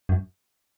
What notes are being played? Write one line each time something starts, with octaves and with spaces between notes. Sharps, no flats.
F#2